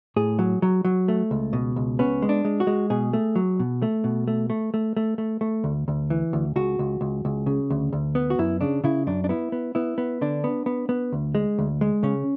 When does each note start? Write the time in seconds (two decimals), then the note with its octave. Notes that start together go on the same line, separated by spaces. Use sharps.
0.16 A2 G#4
0.39 F#3
0.62 F#3
0.85 F#3
1.08 A3
1.31 C#2
1.53 B2
1.76 C#2
1.99 B3 C#4
2.22 G#3
2.29 D4
2.45 G#3
2.60 F#4
2.67 G#3
2.90 B2 G#4
3.13 A3
3.35 F#3
3.60 B2
3.82 A3
4.04 B2
4.28 A3
4.50 A3
4.74 A3
4.97 A3
5.18 A3
5.41 A3
5.64 D2
5.88 D2
6.10 E3
6.33 D2
6.56 C#2 F#4
6.79 C#2
7.01 C#2
7.25 C#2
7.46 C#3
7.70 D2
7.93 D2
8.15 B3
8.30 F#4
8.39 F#2 E4
8.61 C#3 D4
8.84 C#3 E4
9.07 F#2 D4
9.24 D4
9.29 B3 E4
9.52 B3
9.75 B3 E4
9.98 B3
10.21 D3 D4
10.44 B3
10.66 B3
10.89 B3
11.13 D2
11.35 G#3
11.58 D2
11.81 G#3
12.03 C#3 C#4